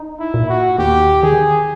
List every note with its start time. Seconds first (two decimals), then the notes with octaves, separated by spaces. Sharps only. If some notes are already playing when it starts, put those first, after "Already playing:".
Already playing: D#4
0.20 E4
0.34 A#2
0.49 F#4
0.78 D#2 G4
1.23 D#3 G#4